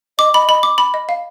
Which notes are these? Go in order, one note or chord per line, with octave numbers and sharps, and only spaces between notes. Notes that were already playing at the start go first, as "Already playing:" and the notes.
D#5 D6
D#5 B5
D#5 B5
D6
B5
D#5
F5